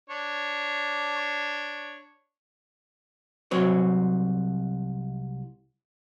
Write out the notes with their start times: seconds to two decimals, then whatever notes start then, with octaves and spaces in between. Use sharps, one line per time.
0.10 D4 C#5
3.51 C2 F#3 C4 C#5